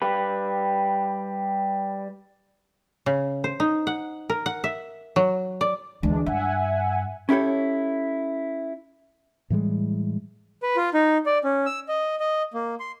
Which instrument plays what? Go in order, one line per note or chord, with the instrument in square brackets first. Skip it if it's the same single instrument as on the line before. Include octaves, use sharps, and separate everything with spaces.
[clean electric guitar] G3 B4
[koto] C#3
C5
D#4
F#5
A#4
F#5
E5
F#3
D5
[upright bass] D2 [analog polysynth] E3 G#3 D4
[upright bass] G2 [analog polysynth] E5 F#5 G#5
[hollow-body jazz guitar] C#4 E4 G4 A4 C#5
[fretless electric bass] A2 E3 G3 G#3
[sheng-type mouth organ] B4
F4
D#4
D5
C#4
E6
D#5
D#5
A#3
C6